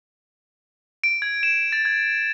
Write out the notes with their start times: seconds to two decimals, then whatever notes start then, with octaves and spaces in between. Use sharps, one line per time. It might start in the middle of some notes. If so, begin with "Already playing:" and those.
1.04 D7
1.22 G#6
1.43 E7
1.72 A6
1.85 G#6